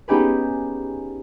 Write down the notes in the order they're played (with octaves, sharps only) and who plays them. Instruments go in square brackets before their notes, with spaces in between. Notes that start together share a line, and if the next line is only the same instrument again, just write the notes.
[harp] B3 C#4 D#4 G4 G#4 B4